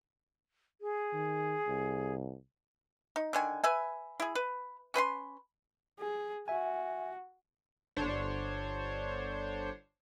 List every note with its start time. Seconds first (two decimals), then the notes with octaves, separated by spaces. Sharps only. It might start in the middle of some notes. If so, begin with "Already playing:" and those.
0.81 G#4
1.13 D#3
1.68 C2
3.16 D#4
3.33 D3 D#3 G#5
3.64 B4 E5 G#5
4.20 E4 G#4
4.35 B4
4.94 C#4 B4 B5 C6
5.99 G#4
6.48 F#4 E5 G#5
7.96 G1 D3 D4 C5 C#5